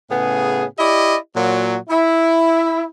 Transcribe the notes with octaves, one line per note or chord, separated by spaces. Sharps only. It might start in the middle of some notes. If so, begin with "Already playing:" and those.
A2 C#3 B3 G#4
E4 G4 D5 D#5
A#2 F#3
E4